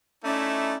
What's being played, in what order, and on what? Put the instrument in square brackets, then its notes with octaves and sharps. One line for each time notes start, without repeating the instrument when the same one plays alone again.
[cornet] A3 [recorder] C#4 [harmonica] D#4 E4 D5